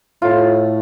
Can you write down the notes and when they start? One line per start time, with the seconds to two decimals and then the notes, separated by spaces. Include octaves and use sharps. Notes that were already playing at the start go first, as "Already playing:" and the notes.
0.22 A2 F4